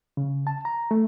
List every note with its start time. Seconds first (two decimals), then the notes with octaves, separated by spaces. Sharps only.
0.17 C#3
0.47 A5
0.65 A#5
0.91 A3